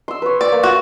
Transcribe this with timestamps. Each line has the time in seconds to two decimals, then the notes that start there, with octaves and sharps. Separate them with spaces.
0.08 C6 E6
0.22 B4 C#5
0.41 D5
0.52 A#3
0.63 F#4